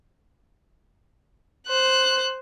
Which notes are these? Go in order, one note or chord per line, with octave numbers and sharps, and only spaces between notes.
C5 F#6